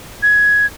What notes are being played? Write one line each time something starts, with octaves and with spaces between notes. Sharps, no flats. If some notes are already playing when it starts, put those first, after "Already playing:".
G#6